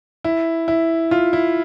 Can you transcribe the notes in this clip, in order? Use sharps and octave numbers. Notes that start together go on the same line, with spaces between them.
E4
E4
F4
E4